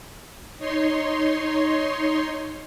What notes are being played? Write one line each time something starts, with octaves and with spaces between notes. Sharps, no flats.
D#4 C#5 C6